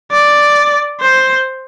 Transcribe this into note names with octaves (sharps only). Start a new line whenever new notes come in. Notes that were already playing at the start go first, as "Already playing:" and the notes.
D5
C5